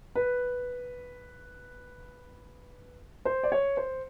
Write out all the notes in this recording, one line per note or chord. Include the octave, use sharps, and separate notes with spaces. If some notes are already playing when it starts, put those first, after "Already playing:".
B4
C5
D5
C#5
C5